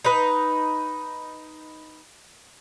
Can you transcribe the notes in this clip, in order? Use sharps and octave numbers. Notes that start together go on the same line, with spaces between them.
D#4 B4